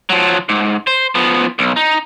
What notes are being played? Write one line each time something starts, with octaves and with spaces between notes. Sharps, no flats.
F3 F#3
G#2
C5
F3 B3
B1
D#4